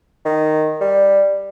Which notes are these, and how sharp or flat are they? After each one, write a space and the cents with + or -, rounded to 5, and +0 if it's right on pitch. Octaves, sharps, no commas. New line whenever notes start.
D#3 -5
G3 +5